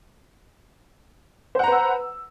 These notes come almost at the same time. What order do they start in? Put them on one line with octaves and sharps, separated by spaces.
C5 F#5 A#5 B4 E6